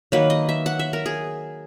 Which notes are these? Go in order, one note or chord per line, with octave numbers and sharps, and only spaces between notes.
D#3 F#3 A#3 B4
D#5
E5
F#5
E5
A#4
G#4